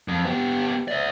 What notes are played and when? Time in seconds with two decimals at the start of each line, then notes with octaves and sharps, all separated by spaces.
0.08 F2
0.25 B3 G4
0.88 D5 E5